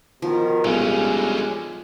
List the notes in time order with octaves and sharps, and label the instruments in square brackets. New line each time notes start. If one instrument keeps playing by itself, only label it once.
[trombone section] B2 D#3 [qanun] F3
[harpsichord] B1 [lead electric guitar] D3 C#4 [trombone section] G3 G#3